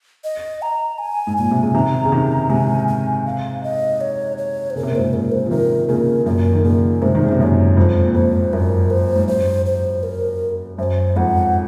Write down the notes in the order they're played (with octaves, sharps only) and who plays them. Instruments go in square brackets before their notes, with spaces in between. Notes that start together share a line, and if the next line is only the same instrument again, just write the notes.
[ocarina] D#5
A#5
G#5
[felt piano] G#2
[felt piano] A#2 [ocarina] G#5
[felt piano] C3
C#3
[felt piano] C3 D#3 [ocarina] A#5
[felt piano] C#3
C3 D#3
[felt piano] G#2 C3 [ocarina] G#5
[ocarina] G#5
F5
D#5
C#5
C#5
C5
[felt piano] C#3 [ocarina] A#4
[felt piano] C3
A#2
[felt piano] G#2 C3 [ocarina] C5
[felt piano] A#2 C#3 [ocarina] A#4
[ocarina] C5
[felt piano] F3
[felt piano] C3 D#3 [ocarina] A#4
[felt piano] A#2 C#3 [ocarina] A#4
[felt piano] F#2 A#2 [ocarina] A#4
[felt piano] D#3
[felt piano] A#2 C#3 [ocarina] A#4
[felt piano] G#2 C3 [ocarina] C5
[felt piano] D#3
C#3
C3
[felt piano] F#2 A#2 [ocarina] C#5
[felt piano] F2 G#2 [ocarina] C5
[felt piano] A#2
[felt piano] F2 G#2 [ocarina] C5
[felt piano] F#2 [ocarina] A#4
[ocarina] C5
[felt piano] G#2
[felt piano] F#2 [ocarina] C5
[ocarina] C5
A#4
[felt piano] F#2 [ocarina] C5
[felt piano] F2 G#2 [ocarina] F#5